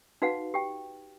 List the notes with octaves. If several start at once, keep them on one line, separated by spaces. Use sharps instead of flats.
D#4 F#4 B4 F5 F#5
G4 G5